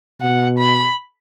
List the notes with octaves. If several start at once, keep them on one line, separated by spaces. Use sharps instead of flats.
B2 F#5
B5